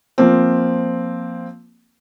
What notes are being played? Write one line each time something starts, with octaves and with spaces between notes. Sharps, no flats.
F3 A#3 C4